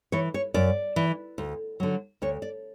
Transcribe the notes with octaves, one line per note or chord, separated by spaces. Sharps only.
E3 C#5
C#5
F#2 D5
E3
D2
D3 F#3
D2 C#5
D5